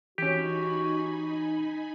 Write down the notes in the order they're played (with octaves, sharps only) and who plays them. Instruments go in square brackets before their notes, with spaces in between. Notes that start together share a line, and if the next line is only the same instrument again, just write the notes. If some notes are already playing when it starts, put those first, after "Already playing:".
[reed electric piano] E3 C#4 [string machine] D#4 G#5 B5 [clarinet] F#4 [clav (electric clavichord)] G4